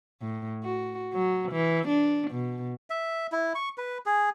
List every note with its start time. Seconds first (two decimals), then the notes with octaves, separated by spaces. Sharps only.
0.21 A2
0.64 F#4
1.13 F#3
1.51 E3
1.88 D4
2.31 B2
2.90 E5
3.32 E4
3.55 C#6
3.78 B4
4.06 G#4